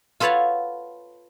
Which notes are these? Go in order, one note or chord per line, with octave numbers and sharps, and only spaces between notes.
F4 A4 B4 C#5 F5 F#5